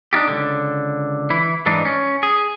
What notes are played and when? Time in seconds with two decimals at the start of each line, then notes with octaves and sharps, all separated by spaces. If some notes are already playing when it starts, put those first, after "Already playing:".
0.13 D4 D#4 F4 G4
0.28 C#2 G2 D3
1.30 E3 E4
1.66 G#2 E3 D4 D#4
1.85 C#4
2.23 G#4